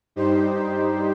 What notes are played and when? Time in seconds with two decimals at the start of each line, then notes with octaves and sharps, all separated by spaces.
0.16 G2 G3 D#4 G4 C5